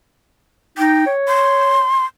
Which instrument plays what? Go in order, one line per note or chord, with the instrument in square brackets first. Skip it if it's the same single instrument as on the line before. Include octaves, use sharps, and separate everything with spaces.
[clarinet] D#4 [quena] G5
[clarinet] C#5
[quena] C6